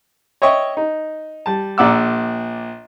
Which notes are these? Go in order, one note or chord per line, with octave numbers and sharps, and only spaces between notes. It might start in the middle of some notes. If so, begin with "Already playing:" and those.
C#5 D#5 E5 G5 C#6
D#4
G3 A5
A#1 A#2 D5 F#5 D6 E6